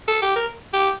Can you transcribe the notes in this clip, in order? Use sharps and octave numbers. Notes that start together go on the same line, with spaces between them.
A4
G4
A#4
G4